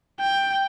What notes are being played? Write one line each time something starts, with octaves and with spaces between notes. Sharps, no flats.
G5